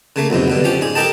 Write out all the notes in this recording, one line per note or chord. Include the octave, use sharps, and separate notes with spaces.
C#3 A3 A#3
B1 F2 G#2 C3
G2 B2 D3
F3 C#4 G4
G#2 G#4
G4 A4 A#4 D#5 G5 A5